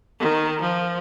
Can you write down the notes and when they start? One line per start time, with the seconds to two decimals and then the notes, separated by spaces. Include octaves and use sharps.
0.20 D#3
0.61 F3